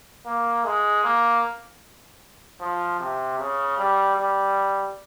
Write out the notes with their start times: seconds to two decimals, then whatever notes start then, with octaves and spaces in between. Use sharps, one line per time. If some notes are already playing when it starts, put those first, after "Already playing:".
0.26 A#3
0.65 G#3
1.04 A#3
2.60 F3
3.00 C3
3.40 C#3
3.79 G3
4.18 G3